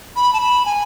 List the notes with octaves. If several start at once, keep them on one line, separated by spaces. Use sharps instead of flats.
B5
A5
B5
G#5